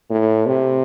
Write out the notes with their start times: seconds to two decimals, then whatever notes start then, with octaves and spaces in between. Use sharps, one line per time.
0.11 A2
0.47 C3